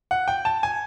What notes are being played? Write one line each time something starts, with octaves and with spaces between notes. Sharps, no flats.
F#5
G5
A5
G#5